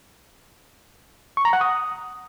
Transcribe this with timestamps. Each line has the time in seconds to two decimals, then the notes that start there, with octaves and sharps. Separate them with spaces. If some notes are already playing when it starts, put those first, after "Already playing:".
1.37 C#6
1.45 A#5
1.53 F#5
1.61 D#6